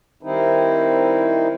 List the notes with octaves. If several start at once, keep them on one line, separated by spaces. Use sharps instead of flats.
D#3 G3 C4 D#4 E4